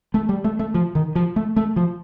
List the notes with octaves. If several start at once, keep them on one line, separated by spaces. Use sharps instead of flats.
A3
G3
A3
A3
F3
D#3
F3
A3
A3
F3